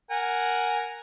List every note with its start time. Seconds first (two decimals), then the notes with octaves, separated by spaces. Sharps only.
0.11 A#4 F#5 G#5